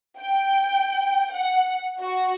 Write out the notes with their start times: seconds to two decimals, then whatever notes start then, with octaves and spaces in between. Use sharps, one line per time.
0.20 G5
1.31 F#5
2.00 F#4